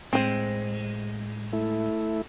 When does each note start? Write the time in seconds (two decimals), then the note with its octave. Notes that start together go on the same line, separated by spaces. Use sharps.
0.13 A2 G#3 C4 C5
1.53 A3 E4